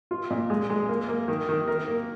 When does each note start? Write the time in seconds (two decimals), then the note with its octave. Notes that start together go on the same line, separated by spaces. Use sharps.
0.11 F4
0.30 A#2
0.50 G#3
0.70 G#3
0.89 A#3
1.09 A#3
1.28 D#3
1.49 D#3
1.68 A#4
1.88 A#3